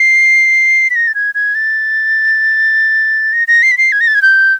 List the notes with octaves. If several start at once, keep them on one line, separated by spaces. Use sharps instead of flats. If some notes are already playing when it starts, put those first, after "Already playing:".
Already playing: C7
B6
A#6
A6
G#6
G#6
A6
A#6
A#6
C7
B6
C7
G#6
A#6
A6
G#6
G6